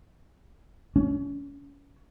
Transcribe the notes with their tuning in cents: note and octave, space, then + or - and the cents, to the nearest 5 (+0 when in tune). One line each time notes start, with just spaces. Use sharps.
C#4 +30